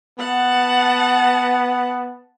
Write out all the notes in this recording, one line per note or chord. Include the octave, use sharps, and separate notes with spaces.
B3 F#5 A5